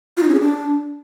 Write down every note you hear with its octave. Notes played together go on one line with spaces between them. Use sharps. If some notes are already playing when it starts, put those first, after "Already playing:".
F4
D#4
C#4
G#4
D4